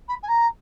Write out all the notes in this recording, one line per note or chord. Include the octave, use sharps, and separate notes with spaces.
B5
G#5
A#5